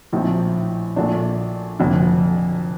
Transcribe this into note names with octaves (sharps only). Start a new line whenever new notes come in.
A#1 A2 F3 C4 D#4
A#1 A#2 A3 D4
F1 F2 D3